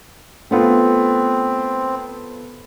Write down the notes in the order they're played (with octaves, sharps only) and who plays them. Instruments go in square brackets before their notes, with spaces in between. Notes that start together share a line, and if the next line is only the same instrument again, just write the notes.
[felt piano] A3 B3 F4 [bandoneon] C4